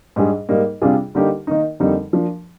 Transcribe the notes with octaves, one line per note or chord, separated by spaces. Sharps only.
G#2 G3 D4 G#4
G#2 G3 A#3 D#4
C3 G3 D4 F4 G#4
D3 G3 A#3 D#4 G4
D#3 A#3 D#4
F2 D3 G3 A#3 D#4
F3 A#3 D4